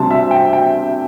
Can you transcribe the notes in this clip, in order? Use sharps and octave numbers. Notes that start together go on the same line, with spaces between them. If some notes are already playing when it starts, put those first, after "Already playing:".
Already playing: D2 C3 G3 A5 C6
E5
G5
G5